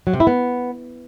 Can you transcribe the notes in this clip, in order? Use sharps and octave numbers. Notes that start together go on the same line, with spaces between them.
F#3
C3
E4
B3